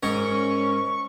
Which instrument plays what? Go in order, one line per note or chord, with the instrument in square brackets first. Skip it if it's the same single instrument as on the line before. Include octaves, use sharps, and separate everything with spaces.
[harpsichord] G#2 A#4 [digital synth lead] C#4 [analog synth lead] C#6